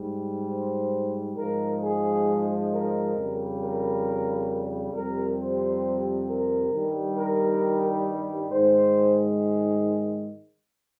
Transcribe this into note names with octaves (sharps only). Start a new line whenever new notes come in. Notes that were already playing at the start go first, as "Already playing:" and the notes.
Already playing: G#2 G3
C5
G#2 F3 G#3 A#4
G#4
A#4
F2 C#3 G3
A#4
F2 C3 G3 A#4
C5
A#4
G2 D#3 G3
A#4
G#2 D#3 G#3 C5